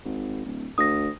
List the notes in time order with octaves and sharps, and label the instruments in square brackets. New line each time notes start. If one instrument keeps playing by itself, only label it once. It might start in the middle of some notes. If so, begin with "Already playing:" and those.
[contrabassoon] G#1
D1
[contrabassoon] D2 [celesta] D#6 A#6